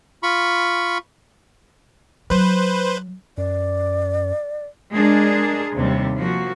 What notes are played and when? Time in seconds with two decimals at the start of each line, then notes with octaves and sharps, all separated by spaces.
0.23 F4 B5 C#6
2.30 F#3 B4 C5
3.38 F#2 D5
4.93 G#3 D4 G#4 A#4
5.74 D#2 C3 G3
6.20 F3 A#3 F#4